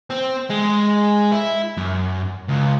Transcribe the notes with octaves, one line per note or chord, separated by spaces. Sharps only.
C4
G#3
E4
F#2
C#2